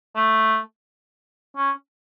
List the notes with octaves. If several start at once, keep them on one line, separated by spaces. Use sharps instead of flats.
A3
C#4